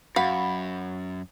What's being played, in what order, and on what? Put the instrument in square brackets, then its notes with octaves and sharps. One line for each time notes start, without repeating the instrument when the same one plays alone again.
[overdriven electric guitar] F#2 [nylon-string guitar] F#4 [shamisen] F5 [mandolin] B5